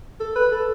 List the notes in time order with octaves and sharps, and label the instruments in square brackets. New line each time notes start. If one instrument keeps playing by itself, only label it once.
[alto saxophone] A4
B4
A4